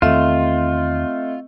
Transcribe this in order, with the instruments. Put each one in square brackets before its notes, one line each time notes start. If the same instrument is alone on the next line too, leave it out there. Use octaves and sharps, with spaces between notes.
[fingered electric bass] E2 D#3 [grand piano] A3 [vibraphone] C4 D#5 [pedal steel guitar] F4